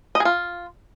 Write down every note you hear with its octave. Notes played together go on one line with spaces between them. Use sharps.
D#5
G#4
F4